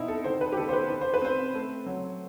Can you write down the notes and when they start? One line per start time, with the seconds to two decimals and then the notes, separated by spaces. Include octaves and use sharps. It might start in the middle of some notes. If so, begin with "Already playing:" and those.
Already playing: B2 C4 D#4 E4
0.08 A4
0.24 D#3 C5
0.41 B4
0.52 G4
0.57 D#3 A4
0.69 C5
0.73 B4
0.89 D#3
1.01 C5
1.14 B4
1.22 C4 C5
1.54 A3
1.86 F#3